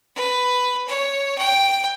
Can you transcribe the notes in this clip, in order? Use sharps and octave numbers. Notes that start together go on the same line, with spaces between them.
B4
C#5
G5